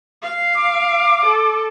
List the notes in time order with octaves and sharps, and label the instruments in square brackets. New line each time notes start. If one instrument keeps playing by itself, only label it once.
[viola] F5
[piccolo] D6
[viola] A4